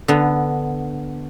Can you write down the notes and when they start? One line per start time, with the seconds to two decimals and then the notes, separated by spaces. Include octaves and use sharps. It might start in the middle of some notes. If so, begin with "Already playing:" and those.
0.08 D3 B3